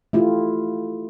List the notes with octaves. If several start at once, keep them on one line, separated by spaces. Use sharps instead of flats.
A3 E4 F4 G4